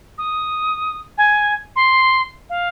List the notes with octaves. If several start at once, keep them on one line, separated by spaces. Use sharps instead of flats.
D#6
G#5
C6
F5